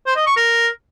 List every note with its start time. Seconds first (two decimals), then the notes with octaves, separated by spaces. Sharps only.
0.06 C5
0.16 D#5
0.26 C#6
0.36 A#4